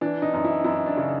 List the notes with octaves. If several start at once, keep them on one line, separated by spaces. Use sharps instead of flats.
E3 D4
D#4
F#2 D#4
E4
F#2 E4
D4
C#3